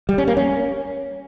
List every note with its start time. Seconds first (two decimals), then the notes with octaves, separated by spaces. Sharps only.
0.09 G3
0.18 C#4
0.27 A#3
0.37 C#4